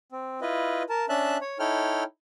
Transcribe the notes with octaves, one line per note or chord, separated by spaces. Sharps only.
C4
E4 F4 B4 D#5
A#4 A5
C#4 D4 E5 A5 F#6
C#5
D#4 E4 A4 C#5 G5 F6